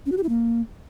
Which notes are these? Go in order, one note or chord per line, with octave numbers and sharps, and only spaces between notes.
C#4
F#4
G4
E4
A#3